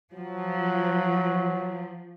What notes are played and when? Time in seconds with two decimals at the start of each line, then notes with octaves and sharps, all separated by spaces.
0.13 F3 F#3